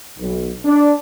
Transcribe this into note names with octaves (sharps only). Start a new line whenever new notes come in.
B1
D4